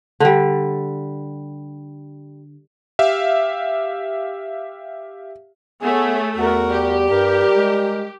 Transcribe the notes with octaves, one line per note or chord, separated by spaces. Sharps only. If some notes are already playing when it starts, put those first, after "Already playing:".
D3 G3
G4 E5 F5
A3 B3 G#4 C#5
E2 F#4 A#4
G3 G4
G2 A#4
G#3